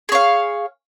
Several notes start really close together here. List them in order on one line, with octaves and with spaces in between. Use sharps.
G#4 C#5 F5